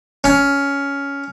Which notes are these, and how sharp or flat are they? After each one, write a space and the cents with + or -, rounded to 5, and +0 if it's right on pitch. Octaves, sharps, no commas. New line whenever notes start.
C#4 +15